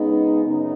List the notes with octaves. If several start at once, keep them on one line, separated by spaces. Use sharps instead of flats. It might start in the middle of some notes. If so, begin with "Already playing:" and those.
Already playing: C#3 G#3 B3 D#4
F#2 C#3 B3 D#4